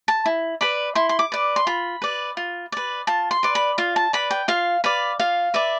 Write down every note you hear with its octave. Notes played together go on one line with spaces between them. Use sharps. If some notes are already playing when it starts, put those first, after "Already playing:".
A5
E4
B4 D5 B5
E4 C6
C6
D6
B4 D5
C6
F4 B5
B4 D5
F4
B4 D5
F4 A5
C6
B4 D5
B5
F4 F5
A5
B4 D5 B5
G5
F4 F5
B4 D5 F5
F4 F5
B4 D5 E5